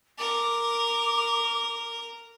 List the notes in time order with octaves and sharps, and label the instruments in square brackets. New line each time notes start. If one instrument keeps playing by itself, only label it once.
[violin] A#4 [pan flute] D6